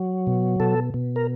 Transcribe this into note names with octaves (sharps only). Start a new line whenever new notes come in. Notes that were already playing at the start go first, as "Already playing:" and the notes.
Already playing: F#3
B2
B2 A4
B2
A#4